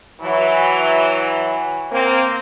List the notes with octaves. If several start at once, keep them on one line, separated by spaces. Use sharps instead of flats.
E3 F#3
A#3 C4